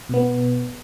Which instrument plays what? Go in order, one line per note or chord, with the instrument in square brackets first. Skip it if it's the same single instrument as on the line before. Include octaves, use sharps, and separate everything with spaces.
[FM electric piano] B2 B3